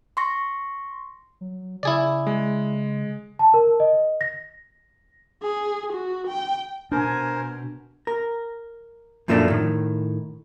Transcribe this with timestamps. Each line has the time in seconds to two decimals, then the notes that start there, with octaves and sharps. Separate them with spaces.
0.17 C6 C#6 A#6
1.41 F#3
1.83 C#3 E4 G#4 D5
2.27 G#3
3.39 A5
3.54 A#4
3.80 D#5
4.21 A#6
5.43 G#4
5.93 F#4
6.27 G5
6.92 B2 D4 A#4 C5 G#5
8.07 A#4
9.28 F#2 A#2 F3 A3 A#3 D4
9.48 A2 D#3